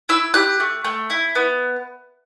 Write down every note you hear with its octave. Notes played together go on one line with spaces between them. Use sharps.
E4 E6
G4 F#6
A3
A3
E4
B3